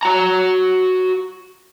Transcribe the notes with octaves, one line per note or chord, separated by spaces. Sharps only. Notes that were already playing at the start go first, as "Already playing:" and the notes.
F#4 A#5